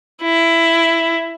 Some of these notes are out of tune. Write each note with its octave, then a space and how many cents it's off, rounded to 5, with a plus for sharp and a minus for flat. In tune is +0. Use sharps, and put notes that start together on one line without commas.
E4 +10